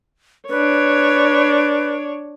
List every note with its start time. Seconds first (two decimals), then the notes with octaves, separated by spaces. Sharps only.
0.49 D4 B4 C#5